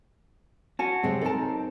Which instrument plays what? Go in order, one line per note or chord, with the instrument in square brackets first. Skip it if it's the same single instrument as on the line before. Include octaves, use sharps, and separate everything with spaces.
[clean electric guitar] C#4 F#4 [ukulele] A5
[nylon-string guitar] C3 F#3 G#3 [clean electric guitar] C4
[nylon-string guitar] D#4 A#4 [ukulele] A4 A5